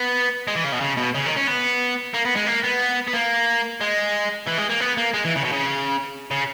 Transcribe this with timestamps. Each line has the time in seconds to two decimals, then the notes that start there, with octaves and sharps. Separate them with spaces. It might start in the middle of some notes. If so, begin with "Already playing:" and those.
Already playing: B3
0.48 G#3
0.56 E3
0.64 C#3
0.72 B2
0.81 C#3
0.97 B2
1.15 C#3
1.26 D#3
1.36 C#4
1.47 B3
2.14 A#3
2.26 B3
2.36 G#3
2.47 A#3
2.64 B3
3.08 B3
3.14 A#3
3.81 G#3
4.47 E3
4.58 G#3
4.70 A#3
4.80 B3
4.97 A#3
5.14 G#3
5.25 E3
5.36 C#3
5.44 B2
5.53 C#3
6.31 C#3